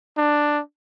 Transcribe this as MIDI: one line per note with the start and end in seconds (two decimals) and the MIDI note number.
0.18 0.60 62